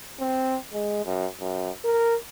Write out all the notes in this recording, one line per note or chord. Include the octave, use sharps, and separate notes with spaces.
C4
G#3
F#2
F#2
A#4